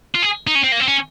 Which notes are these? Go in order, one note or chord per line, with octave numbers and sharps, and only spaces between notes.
F4
G#4
D#4
C#4
C4
A#3
C4
C#4